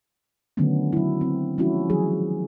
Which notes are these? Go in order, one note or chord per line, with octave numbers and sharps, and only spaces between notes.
D3 D#3 F#3 A3 B3 C#4
F#3 E4
C4
F3 G#3 C#4 E4 F#4
D#3 F3 F#3 G#4